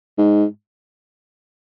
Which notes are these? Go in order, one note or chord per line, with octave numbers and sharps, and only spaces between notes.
G#2